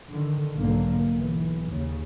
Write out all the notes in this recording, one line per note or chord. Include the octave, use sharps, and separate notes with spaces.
D3 D#3
B1 G#2 D3 A#3
B1 E3
D#2 C#3